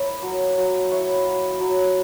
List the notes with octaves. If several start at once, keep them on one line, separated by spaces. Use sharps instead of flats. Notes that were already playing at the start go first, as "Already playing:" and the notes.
Already playing: A#3 E4 C#5
F#3
F#3
E4 C#5
F#3
F#3